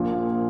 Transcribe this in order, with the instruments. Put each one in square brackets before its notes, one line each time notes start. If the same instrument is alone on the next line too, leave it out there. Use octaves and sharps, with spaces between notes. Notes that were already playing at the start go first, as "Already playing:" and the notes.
Already playing: [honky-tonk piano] A#1 A#2 F3